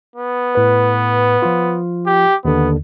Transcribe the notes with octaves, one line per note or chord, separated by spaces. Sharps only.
B3
A2 B4
F3 F4
G4
D#2 D3 B3